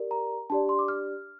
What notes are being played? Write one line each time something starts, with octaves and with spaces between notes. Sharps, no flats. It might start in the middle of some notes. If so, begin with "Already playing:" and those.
Already playing: G4 A#4 D5
A#5
D4 G4 D5 A5
C6
D6
F6